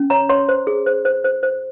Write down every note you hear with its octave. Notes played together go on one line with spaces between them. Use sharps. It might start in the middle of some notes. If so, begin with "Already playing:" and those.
Already playing: C#4
C#5 A#5
C#5 C6
C5
G#4
C5
C5
C5
C5